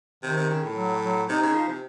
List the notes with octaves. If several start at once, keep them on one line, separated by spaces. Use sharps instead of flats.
C3 D#3
C3
C#3
A2
F#3
F#3
C3 D#4
C#3
F3
C3